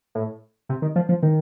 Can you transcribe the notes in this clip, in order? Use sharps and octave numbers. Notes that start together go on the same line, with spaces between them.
A2
C3
D#3
F3
F3
D#3